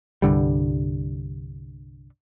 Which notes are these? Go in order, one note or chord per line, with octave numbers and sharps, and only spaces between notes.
C2 G2 D3 G3